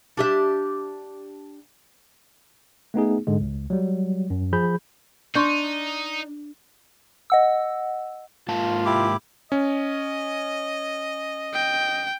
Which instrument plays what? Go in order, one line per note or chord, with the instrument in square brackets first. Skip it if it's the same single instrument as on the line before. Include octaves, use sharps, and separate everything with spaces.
[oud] D4 G4 E5
[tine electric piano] A3 B3 D#4 G#4
G#2 D3 G#3
C#2
F#3 G3
F#2
F3 G#4 B5 G6
[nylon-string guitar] D4 [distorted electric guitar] D#4 [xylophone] C6 C#6 G6
[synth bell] D#5 F#5 E6
[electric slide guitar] G#2 A#3 A5 [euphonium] F4
[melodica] E4 G4 D6
[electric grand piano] C#4 [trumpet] D#5
[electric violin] G5